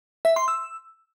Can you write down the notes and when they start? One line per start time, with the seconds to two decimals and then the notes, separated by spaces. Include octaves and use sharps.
0.25 E5
0.36 C6
0.48 E6